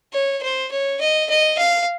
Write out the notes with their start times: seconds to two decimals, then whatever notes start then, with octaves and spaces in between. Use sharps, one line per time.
0.13 C#5
0.43 C5
0.71 C#5
1.01 D#5
1.30 D#5
1.58 F5